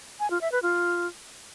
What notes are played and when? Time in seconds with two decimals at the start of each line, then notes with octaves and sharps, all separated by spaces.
0.20 G#5
0.30 F4
0.41 E5
0.52 B4
0.63 F4